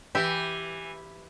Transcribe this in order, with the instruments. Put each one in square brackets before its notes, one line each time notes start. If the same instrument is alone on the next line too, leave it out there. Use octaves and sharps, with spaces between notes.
[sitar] E3 [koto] G4 E5